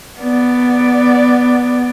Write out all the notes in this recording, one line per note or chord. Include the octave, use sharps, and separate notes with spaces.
B3 D5